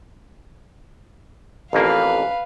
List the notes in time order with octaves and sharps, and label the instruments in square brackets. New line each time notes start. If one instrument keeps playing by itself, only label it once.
[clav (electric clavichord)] A1 F2 A#3 [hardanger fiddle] B4 F5